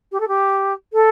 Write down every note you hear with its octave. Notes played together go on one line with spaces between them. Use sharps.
G4
A4
G4
A4